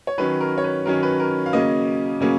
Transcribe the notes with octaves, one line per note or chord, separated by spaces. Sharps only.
C#5
D#3 F#3 C#4 B4
A#4
C#5
B4
D#3 F#3 C#4 A#4
B4
A#4
F5
C#3 F#3 A#3 C#4 D#5
C#3 F#3 A#3 C#4